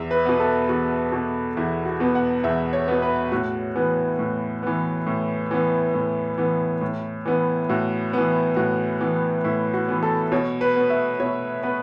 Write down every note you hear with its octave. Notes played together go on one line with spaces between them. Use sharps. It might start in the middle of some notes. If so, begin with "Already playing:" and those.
Already playing: E2 E5
B4
B2 B3
A4
E2 F#4
B2 B3
E2 E4
F#4
B2 B3
F#5
E2 E5
C#5
B2 B3
B4
A2 F#4
E3 B3
A2
E3 B3
A2
E3 B3
A2
E3 B3
A2
E3 B3
A2 F#4
E3 B3
A2 F#4
E3 B3
A2 E4
F#4
E3 B3
A4
B2 C#5
B4
B3
E5
B2 C#5
B3 B4